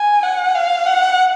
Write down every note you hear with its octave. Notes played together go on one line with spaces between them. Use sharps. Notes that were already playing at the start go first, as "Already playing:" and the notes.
Already playing: G#5
F#5
F5
F#5